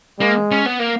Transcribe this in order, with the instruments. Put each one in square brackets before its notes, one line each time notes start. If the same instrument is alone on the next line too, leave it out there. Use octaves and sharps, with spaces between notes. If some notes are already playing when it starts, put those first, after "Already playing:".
[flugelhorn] G#3 [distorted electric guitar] A#3
[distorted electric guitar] C#4
B3
A#3